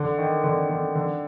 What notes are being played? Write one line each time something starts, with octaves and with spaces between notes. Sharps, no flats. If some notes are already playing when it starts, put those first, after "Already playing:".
Already playing: D3
D#3
D3
D3
D3